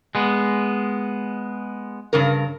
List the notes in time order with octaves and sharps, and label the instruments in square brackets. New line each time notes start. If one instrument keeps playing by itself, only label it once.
[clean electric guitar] G#3 B3
[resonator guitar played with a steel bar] G2 C#3 A#4